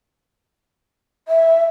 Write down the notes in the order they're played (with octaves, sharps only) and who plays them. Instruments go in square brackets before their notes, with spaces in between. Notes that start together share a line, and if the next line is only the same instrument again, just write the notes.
[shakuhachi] E5